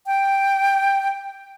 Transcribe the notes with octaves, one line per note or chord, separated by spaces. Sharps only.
G5